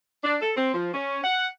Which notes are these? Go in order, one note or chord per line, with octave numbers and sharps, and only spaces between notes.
D4
A4
C4
F3
C#4
F#5